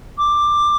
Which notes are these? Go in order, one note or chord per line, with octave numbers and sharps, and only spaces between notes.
D6